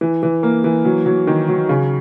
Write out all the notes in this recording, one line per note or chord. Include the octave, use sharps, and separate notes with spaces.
E3
E3
A#3
E3
F#3
F#3
D#3
F#3
C#3